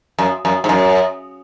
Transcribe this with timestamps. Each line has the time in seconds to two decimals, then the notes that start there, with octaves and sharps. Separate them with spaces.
0.18 F#2
0.45 F#2
0.64 G#2
0.69 F#2